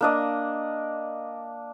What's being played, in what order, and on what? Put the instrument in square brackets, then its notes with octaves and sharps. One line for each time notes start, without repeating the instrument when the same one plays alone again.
[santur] A#3 D4 D#5